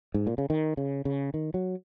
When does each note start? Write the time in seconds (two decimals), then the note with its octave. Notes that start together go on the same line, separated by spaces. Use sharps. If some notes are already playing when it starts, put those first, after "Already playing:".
0.14 G#2
0.27 A#2
0.38 C#3
0.50 D#3
0.77 C#3
1.05 C#3
1.34 D#3
1.54 F#3